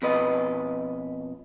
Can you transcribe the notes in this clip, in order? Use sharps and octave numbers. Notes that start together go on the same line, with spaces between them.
F2 B2 B4 D#5